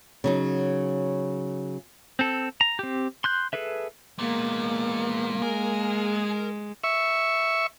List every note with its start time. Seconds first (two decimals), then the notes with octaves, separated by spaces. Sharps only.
0.24 C#3 F#3 D#4
2.19 C4 A4
2.61 A#5
2.79 C4 G4
3.24 C6 F#6 G6
3.53 G#4 A4 B4 E5
4.19 A#2 G#3 A#3 B3
5.43 G#3 G#4 A#4
6.84 E5 C#6